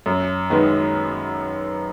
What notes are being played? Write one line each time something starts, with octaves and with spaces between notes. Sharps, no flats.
F#2
D#3 G#3 B3